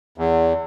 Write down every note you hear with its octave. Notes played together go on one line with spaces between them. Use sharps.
E2